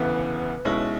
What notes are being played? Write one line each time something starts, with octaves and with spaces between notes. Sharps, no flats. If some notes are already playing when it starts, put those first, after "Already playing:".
Already playing: E1 D2 C#3 E3 B3 B4
B1 B2 G#3 C#4 E4